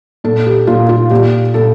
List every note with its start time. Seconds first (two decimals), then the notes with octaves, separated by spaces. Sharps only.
0.24 A#2 A4
0.46 G4
0.67 A#2 F4
0.89 F4
1.10 A#2 G4
1.54 A#2 A4